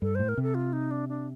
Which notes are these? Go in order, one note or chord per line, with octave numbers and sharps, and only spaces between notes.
G2 A4
A2 C5
A#4
C3 A4
F4
D#4
D4
D4